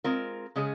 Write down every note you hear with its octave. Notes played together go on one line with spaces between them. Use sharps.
G#3 C4 F4 A#4
C#3 G#3 C#4 G#4